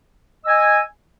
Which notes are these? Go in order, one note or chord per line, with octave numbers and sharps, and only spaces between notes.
D#5 G#5 E6